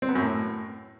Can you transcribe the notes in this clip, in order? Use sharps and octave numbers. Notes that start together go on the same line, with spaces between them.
C4
B3
F#2
A2